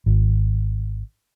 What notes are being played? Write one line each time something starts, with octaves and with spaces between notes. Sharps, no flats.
G#1